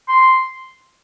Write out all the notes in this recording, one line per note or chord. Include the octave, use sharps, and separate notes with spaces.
C6